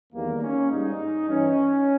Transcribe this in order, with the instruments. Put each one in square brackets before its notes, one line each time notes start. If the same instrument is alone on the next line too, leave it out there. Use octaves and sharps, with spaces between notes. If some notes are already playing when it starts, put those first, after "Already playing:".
[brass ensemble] E2 D#3 G3 A#3
C#4
G#2 G3 D#4
G2 E3 G3 C#4